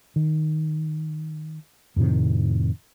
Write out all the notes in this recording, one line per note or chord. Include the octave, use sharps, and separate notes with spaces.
D#3
F2 A2 C3 D#3